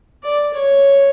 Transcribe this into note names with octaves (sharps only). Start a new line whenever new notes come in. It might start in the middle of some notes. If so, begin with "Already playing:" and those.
D5
C#5